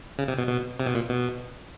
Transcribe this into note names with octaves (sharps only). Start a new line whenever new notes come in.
C#3
C3
B2
B2
C3
B2
A#2
B2